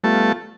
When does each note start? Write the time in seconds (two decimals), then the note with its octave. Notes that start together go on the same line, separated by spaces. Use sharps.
0.04 G3 A3 B3 F4